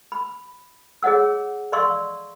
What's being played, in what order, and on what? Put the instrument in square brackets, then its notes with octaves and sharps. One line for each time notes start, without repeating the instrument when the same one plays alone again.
[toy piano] B5
G#4 C#5 D#5 F#5 E6
D5 D#5 F5 C6 C#6 E6